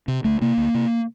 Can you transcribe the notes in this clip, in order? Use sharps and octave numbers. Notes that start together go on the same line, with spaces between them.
C3
D2 A3
C3 A#3
D2
C3